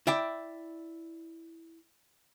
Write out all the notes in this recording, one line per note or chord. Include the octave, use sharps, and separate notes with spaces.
E4 D5 G5